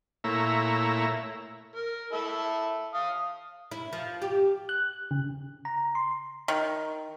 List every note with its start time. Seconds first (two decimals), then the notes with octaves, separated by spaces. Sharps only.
0.24 A#2 A3 E4 C#5 A#5 E6
1.75 A#4
2.12 E4 A4 E5
2.94 F5 D#6
3.71 E4
3.93 F3
4.22 G4
4.69 F#6
5.11 C#3
5.65 A#5
5.95 C6
6.48 D#3